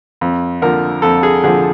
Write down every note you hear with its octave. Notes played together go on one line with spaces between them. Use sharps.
F2
D3 F3 A#4
F2 A4
G#4
D3 F3 G#4